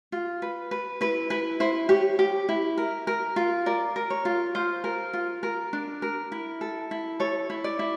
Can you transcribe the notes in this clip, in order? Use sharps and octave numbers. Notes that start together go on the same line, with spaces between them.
F4
B4
B4
E4 B4
E4 B4
E4 C5
G4 C#5
G4
E4
A#4
A#4
F4
A#4 D5
A#4
C#5
F4
F4 C5
A#4
F4
A#4
D4
A#4
E4
A4
E4
A4 C#5
E4
D5
E4